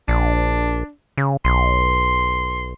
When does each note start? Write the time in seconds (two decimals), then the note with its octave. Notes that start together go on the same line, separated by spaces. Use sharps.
0.08 A#1 D4
1.18 C#3
1.45 B1 C6